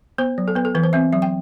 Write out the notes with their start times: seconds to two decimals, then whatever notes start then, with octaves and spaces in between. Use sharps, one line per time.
0.18 B3 C5
0.38 F#3
0.48 A4
0.55 B3 B4
0.65 A4
0.75 E3 B4
0.83 C5
0.93 C4 E5
1.13 F#3 E5
1.22 G5